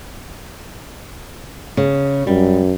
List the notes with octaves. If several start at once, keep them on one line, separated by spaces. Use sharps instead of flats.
C#3
F#2 G3